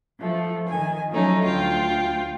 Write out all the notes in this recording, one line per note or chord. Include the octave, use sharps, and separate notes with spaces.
F3 A3
D#3 G#5
F3 F#3 A3 C#4 D#4
D2 F4 G5